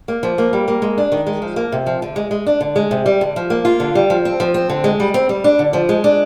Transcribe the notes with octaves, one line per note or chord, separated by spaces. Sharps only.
A#3
F3
A#3
G3
A#3
G#3
D4
D#3
G#3
F3
A#3
C3
F3
D3
G#3
G#3
D4
D3
G#3
C3
G3
D3
F3
A#3
F4
D3
G3
F3
C4
F3
C4
D3
G#3
G3
C4
G3
D4
D3
F3
G#3
D4